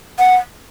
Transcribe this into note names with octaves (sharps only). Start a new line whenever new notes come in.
F#5